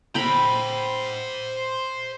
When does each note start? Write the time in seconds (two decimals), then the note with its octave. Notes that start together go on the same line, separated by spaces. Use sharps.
0.15 C5 G5 A#5 B5